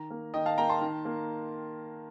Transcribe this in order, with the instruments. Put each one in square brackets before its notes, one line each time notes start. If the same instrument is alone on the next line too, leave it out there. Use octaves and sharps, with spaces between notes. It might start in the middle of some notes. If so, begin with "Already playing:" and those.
Already playing: [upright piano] D#3 A#5
A#3
D#3 D#5 G5
F5 A5
A#3 G5 A#5
A5 C6
D#3
A#3